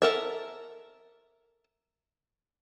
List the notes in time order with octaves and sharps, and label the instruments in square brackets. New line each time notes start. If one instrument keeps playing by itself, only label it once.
[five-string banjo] A4 A#4 E5